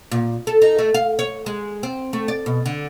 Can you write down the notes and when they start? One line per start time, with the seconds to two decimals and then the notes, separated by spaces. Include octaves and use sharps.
0.11 A#2
0.47 A4
0.62 D#4
0.78 A3
0.94 F5
1.19 C#5
1.46 G#3
1.83 C4
2.13 A3
2.28 D5
2.46 B2
2.66 D3